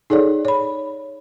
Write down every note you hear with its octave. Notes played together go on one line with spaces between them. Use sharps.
D#4 G#4 A4 C#5 D5
C#5 B5